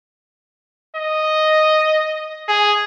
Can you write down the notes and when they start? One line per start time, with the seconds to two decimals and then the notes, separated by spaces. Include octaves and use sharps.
0.96 D#5
2.48 G#4